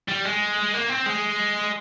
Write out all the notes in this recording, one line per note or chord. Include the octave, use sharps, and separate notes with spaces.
G3
G#3
A#3
C4
G#3